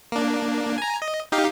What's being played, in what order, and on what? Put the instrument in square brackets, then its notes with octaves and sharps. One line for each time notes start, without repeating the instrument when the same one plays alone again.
[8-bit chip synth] A#3 D4
G#5 A#5
D#5
D#4 G4 F5